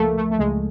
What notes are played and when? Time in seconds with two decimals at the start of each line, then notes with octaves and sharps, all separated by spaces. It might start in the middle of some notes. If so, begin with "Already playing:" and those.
Already playing: C#2 F3 A3 A#3
0.17 A3
0.31 A3
0.39 C#2 G#3